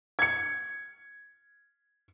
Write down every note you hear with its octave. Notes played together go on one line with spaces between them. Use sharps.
G#6 C#7